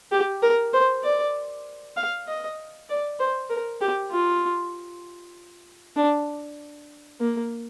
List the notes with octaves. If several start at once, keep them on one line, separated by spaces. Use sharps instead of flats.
G4
A#4
C5
D5
F5
D#5
D5
C5
A#4
G4
F4
D4
A#3